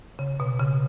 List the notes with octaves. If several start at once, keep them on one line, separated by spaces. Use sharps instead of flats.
C#3
B2
C#3